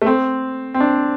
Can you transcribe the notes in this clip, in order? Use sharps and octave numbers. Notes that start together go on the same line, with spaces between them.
A3
C4
C4
D4